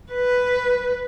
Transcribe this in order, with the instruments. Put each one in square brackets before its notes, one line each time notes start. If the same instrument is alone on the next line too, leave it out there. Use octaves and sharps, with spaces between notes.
[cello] B4